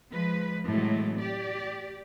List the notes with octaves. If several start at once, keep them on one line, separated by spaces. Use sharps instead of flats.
F3 G#3 B4
A2 C3 E3 F#3 G#3 A3
G4 D5